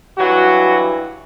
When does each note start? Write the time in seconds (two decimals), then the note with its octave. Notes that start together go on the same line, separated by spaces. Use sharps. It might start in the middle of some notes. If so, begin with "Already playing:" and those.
0.18 G2 E3 F#3 F#4